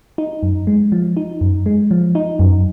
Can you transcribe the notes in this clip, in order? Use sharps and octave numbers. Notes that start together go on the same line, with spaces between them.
D#4
F#2
G#3
F3
D#4
F#2
G#3
F3
D#4
F#2